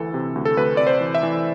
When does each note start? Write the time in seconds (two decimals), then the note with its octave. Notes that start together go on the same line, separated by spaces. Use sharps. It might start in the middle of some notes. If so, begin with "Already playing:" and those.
Already playing: D2 E3 A4
0.14 C3
0.35 D2
0.45 A4
0.57 D2 B4
0.77 C3 D5
0.87 C5
1.01 E3
1.15 E5
1.23 E3